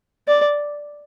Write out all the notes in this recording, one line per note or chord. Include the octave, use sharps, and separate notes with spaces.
D5